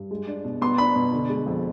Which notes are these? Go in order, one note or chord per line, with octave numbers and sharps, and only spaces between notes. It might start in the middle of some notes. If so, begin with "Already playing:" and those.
Already playing: G2
G#3
D4
B2
B3 C6
D4 B5
B2
D3
G#3
F2